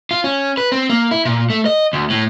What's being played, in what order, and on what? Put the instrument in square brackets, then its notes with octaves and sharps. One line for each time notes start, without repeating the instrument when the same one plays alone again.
[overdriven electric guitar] F4
C#4
B4
C4
A#3
E4
A#2
A3
D#5
D2
A2